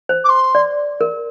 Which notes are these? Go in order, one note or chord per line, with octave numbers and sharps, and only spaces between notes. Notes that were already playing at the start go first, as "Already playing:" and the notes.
C5
D6
C6
D5
A#4